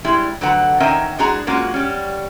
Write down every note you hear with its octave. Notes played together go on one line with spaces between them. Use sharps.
G3 G#3 E4
D3 F#3 A3 B4 F#5 A#5
D#3 C4 C#4 A#4 D#5 E5
E3 G#3 D4 F#4 G#4 A#5
G#3 A#3 C#4 F4 F#4
G3 C#4